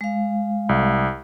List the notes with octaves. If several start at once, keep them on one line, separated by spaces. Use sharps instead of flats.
G#3 F5
C2